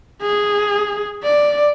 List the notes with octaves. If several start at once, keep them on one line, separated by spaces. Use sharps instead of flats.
G#4
D5